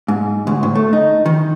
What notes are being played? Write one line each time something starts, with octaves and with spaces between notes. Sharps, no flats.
G#2
D2
A2
A3
D#4
D#3